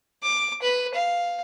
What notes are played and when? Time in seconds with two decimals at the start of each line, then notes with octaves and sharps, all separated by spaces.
0.23 D6
0.62 B4
0.94 F5